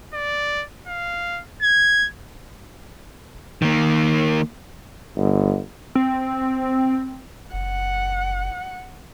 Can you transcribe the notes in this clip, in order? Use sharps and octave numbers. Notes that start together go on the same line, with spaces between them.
D5
F5
G#6
D#3 A#3
G1
C4
F#1 F#5